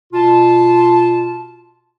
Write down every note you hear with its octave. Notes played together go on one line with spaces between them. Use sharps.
B2 F4 A5